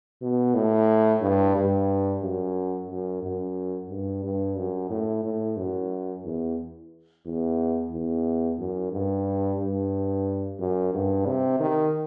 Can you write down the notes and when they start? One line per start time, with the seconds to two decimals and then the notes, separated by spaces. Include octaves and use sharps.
0.22 B2
0.54 A2
1.21 G2
1.56 G2
2.23 F#2
2.89 F#2
3.23 F#2
3.89 G2
4.24 G2
4.56 F#2
4.90 A2
5.24 A2
5.57 F#2
6.24 E2
7.25 E2
7.91 E2
8.59 F#2
8.92 G2
9.59 G2
10.59 F#2
10.94 G2
11.26 C3
11.60 D#3